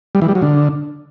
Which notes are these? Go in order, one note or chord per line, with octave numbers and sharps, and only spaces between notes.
G3
E3
G3
F#3
D3